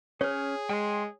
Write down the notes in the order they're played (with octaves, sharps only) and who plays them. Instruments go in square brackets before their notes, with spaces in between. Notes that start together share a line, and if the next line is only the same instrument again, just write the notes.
[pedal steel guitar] C#4 F6 [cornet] G#4 [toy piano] C#5
[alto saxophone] G#3 [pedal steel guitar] G5 C6